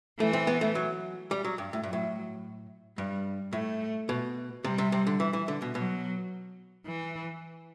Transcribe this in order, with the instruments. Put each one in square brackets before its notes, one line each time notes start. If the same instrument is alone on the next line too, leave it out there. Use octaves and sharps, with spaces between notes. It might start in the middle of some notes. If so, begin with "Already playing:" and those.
[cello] E3 [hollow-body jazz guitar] A3
[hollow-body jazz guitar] C4
B3
A3
F#3
G3
F#3
G2
A2
[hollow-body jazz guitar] G2 [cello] F#3
[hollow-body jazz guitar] A2
[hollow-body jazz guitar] G2 [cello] G3
[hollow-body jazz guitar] A2 [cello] A3
[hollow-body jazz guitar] B2
[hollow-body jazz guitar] C3 [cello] G3
[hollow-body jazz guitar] C3
C3
D3
E3
E3
D3
B2
[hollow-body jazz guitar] B2 [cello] F#3
[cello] E3